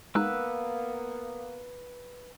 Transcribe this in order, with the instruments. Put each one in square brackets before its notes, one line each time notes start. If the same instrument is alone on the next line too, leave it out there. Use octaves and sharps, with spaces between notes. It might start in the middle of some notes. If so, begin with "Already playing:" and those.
[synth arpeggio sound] G#3 D#4 [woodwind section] A#3 B3 [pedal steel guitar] B4 E6 F#6